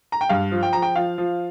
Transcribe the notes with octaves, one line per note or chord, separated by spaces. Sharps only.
A#5
G5
G2 F5
F3
G5
F3 A#5
G5
F3 F5
F3